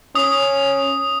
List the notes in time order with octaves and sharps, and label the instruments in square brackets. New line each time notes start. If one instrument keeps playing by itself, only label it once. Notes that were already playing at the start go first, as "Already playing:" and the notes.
[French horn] C#4 [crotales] D#6